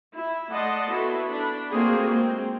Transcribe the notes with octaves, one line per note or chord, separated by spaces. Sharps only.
E4
A3 D5 D#5 F#5 A5 C6
B3 E4 F#4 A4
D4 B5
A3 A#3 C4 F4 F#4 G#4
G#3 C4